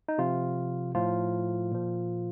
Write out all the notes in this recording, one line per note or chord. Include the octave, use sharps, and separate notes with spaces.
D#4
C3 F3 F4
A2 F3 F4
A#2 F3